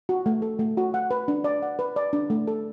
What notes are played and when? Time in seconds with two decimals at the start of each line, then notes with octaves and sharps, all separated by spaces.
0.09 F#4
0.26 A3
0.42 A4
0.59 A3
0.77 F#4
0.94 F#5
1.11 B4
1.28 D4
1.44 D5
1.62 F#5
1.79 B4
1.96 D5
2.13 D4
2.30 A3
2.47 A4